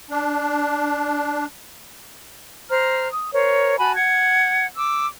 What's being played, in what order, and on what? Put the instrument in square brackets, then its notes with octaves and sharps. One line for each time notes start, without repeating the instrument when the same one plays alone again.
[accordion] D4
[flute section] C5 A#5 F6
D#6
A#4 C5 C#5
F#4 G#5 A5 B5
F#5 G#6
D6 E6